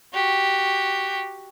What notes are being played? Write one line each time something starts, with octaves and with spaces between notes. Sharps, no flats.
F#4 G4